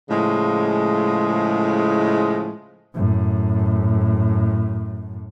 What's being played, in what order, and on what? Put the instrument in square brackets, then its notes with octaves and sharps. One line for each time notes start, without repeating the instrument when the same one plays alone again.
[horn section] A2 C#3 F3 G#3
[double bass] F#2 A2